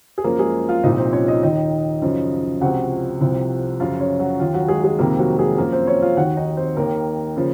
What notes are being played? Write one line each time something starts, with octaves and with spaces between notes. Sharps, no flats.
G#4
F#2 F3 A#3 A#4
G#3 G#4
F4 F5
C2 A#2 F3 D#4 D#5
C4 C5
C#4 C#5
D#4 D#5
D#2 D#3 D#4 D#5
F#2 C#3 F3
C#2 C3 F3 F#4 F#5
C2 C3 F3
F#2 C#3 F3 F4 F5
C#4 C#5
F#3 F#4
D#2 D#3 F4
F#3 F#4
G#3 G#4
G#3 G#4
F2 C3 D#3 A#3 A#4
F#3 F#4
G#3 G#4
F#2 F3 A#3 A#4
C4 C5
C#4 C#5
F4 F5
D#2 D#3 F#4 F#5
D#4 D#5
C4 C5
D#2 D#3 A#3 A#4
C#3 F3